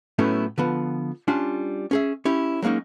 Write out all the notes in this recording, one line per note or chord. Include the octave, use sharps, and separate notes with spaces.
A2 F#3 A3 B3 C#4 E4
D3 F3 B3
G3 C#4 D4 F4
C#4 G#4 E5
C#4 E4 G4
F#3 G#3 A#3 C#4 D#4